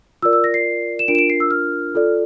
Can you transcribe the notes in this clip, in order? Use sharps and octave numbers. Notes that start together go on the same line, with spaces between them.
F4 A#4 D5 E6
E6
A#6
C7
E7
D4 F4 A#4 D7
E7
D7
C7
E6
F6
F4 A4 D5